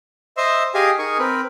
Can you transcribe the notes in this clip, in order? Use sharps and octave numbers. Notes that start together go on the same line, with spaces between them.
C5 D#5 E5 C6 E6
G4 G#4 D#5 F5 G#5
D#4 G#4 A#4 G#5 C#6
C4 A#4 B4